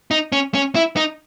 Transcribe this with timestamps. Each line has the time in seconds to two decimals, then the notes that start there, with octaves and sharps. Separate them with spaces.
0.11 D#4
0.32 C#4
0.54 C#4
0.75 E4
0.97 D#4